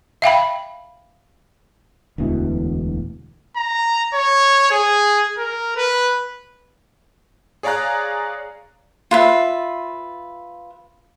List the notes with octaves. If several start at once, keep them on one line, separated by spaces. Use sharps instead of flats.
E5 F5 G5 B5
E1 D2 B2 E3
A#5
C#5
G#4
A#4
B4
G#4 C#5 D5 F5 A#5 F#6
F4 B4 E5